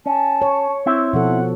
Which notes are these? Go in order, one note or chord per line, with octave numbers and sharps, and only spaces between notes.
C#4 A5
C#5
C4 E4 E5
B2 F3 A4 F#5